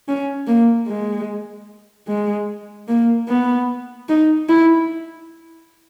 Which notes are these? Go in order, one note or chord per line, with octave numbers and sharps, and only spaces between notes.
C#4
A#3
G#3
G#3
A#3
B3
D#4
E4